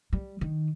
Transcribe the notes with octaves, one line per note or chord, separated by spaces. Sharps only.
G3
D#3